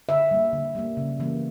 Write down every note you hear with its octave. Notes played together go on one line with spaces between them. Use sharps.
D3 E5
G3 A#3
D3
G3 A#3
C#3
E3 G3 A#3